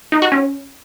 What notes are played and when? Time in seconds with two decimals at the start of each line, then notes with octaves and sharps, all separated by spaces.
0.12 D#4
0.22 F#4
0.32 C#4